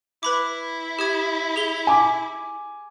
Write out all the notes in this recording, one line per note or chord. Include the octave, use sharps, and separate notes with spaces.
E4 B4 B5 D6
G4 D#6 G#6
G#4 F7 G7
G#5 D6